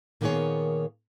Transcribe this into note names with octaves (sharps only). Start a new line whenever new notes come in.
A#2 D#3 A#3 B3 G#4 C#5